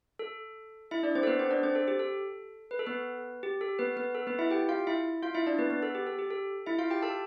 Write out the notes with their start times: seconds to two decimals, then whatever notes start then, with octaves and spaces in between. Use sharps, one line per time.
0.19 A4
0.91 E4 E5
1.03 D4 D5
1.15 C4 C5
1.23 A4
1.27 B3 B4
1.39 C4 C5
1.51 D4 D5
1.63 C4 C5
1.75 A4
1.88 G4
1.99 A4
2.71 B4
2.79 A4
2.87 B3 B4
3.43 G4
3.61 A4
3.79 B3 B4
3.96 B3 B4
4.15 A4
4.27 B3 B4
4.39 E4 E5
4.51 G4 G5
4.69 F4 F5
4.87 E4 E5
5.23 F4 F5
5.35 E4 E5
5.46 D4 D5
5.58 B3 B4
5.70 B3 B4
5.82 A4
5.95 G4
6.07 A4
6.19 G4
6.30 A4
6.66 E4 E5
6.78 F4 F5
6.90 G4 G5
7.02 A4 A5